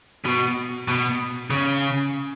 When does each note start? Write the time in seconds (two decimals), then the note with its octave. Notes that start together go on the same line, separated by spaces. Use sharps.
0.25 B2
0.88 B2
1.50 C#3